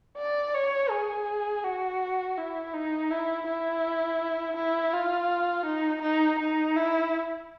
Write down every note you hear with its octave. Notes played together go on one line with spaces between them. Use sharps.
D5
C#5
G#4
F#4
E4
D#4
E4
E4
E4
F4
D#4
D#4
D#4
E4